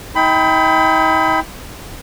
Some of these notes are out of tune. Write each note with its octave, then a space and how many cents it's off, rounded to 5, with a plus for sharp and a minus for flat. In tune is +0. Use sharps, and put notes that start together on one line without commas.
D#4 +40 G5 +0 B5 +25